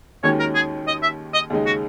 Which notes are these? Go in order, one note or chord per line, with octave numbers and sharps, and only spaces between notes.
D#2 D#3 G#3 C#4 F#4 C#5
A#4
G#4
D#5
E5
D#5
D#2 C#3 G#3 D#4
F#4